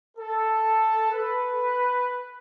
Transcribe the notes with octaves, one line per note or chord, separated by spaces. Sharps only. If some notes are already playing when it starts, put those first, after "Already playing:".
A4
B4